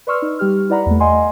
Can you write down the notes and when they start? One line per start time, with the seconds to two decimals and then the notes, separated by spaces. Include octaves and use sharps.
0.07 B4 D5 C6 C#6 E6 F6
0.22 D#4
0.39 G3 G4 F6
0.69 E4 B4 D5 F#5 A#5 B5
0.86 E2 A3
1.00 D#5 F#5 G#5 C6